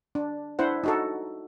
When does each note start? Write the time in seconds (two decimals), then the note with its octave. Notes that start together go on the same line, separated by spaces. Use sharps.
0.15 D4
0.59 D4 E4 C5 F#5
0.84 D#4 F#4 A4